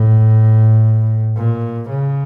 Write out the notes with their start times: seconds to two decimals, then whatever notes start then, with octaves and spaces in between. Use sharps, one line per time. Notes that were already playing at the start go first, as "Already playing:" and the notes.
Already playing: A2
1.36 A#2
1.89 C#3